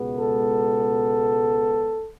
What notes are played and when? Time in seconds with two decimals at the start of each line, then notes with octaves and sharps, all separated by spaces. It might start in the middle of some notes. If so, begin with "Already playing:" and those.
Already playing: C#2 B2 G#3 B3
0.18 A4